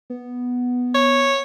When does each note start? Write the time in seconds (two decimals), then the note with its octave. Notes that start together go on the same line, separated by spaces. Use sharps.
0.10 B3
0.95 C#5